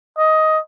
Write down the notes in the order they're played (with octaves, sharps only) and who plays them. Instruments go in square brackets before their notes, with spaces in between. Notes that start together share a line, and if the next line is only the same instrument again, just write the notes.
[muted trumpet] D#5